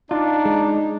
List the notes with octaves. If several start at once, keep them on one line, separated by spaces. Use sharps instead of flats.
D4 D#4 F4
G#3